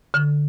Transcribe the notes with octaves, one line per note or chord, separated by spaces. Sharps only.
D3